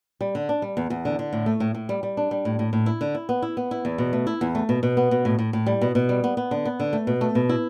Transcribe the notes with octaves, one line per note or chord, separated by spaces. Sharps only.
G3
D3
D4
G3
E2
E2
D3
D3
A2
A3
A2
A2
G3
G3
D4
G3
A2
A2
A2
E4
D3
E4
B3
E4
B3
E4
E2
B2
A3
E4
E2
A3
B2
B2
B3
B2
A2
A2
A2
G3
B2
B2
G3
B3
B3
D3
B3
D3
A3
B2
A3
B2
E4